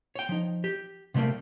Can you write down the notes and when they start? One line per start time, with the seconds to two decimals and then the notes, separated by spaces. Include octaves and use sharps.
0.15 C#5 G5
0.29 F3 D#4
0.64 G4
1.14 C3 F3 G3 A3 A#3